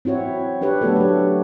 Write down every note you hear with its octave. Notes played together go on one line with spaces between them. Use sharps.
C4 E4 F#4 C#5
D4 G4 B4 C#5
F#3 A3 B3 D4 F#4 A4
D4 G4